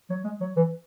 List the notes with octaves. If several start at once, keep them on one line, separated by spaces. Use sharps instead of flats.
F#3
G#3
F#3
E3